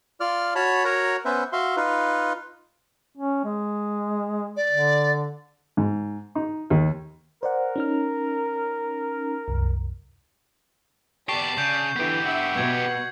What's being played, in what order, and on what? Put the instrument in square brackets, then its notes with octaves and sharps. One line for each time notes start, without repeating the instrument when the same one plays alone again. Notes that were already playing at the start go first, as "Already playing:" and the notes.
[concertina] F4 D5 F6
F#4 C#5 A5 B5
F#4 A#4 C#5 F#5 A#5
B3 C#4 B4 C5 E5
F#4 E5 F5 C6
D#4 F4 B4
[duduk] C#4
G#3
[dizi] D5
[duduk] D3
[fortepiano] G#2
D#4
D#2
[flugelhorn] A#4 [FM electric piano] C5 D5 F#5
[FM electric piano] C#4 D#4 F6
C2 F#2
[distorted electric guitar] B3 G4 [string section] D5 [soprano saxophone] A5 [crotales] C#6 C7
[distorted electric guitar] C#3 [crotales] G6
[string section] D3 E3 [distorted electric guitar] B3 G4
[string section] E5 [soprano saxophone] F#5
[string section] B2 [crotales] G#6